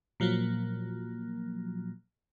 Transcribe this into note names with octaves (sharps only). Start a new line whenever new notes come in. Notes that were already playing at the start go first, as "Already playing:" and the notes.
A#2 F3 F#3 A#3